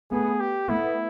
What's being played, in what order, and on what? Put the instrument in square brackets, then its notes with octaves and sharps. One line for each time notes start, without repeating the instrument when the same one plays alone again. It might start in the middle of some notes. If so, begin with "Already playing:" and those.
[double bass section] A3 B3 [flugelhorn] G#4
[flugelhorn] G4
[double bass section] A3 B3 [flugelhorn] E4